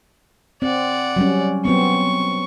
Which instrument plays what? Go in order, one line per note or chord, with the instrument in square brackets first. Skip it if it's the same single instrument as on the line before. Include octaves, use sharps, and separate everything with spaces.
[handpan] C4 [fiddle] D5 F#5
[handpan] F#3 G3 C#4
[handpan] F#3 B3 C4 [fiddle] C#6